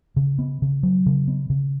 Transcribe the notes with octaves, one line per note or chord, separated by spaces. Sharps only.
C#3
B3
C#3
F#3
C#3
B3
C#3